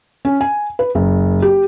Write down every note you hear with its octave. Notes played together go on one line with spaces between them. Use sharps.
C#4
G#5
B4
F#1
G4